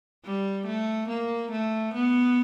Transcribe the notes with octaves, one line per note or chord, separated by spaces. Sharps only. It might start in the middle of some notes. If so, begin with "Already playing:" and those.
G3
A3
A#3
A3
B3